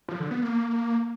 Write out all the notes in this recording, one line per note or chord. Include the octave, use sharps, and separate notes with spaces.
F3
D3
B3
A#3